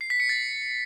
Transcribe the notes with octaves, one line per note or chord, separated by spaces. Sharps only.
C7
B6
C#7
A6